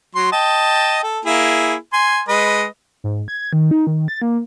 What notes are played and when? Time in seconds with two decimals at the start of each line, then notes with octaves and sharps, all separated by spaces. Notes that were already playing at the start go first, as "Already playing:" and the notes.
0.15 F#3 C6
0.32 D#5 G5 A5
1.03 A4
1.25 A#3 E4 G#4
1.93 G#5 C6
2.28 G#3 B4 D#5
3.04 G#2
3.28 G#6
3.53 D#3
3.71 D#4
3.87 D#3
4.08 A6
4.22 A#3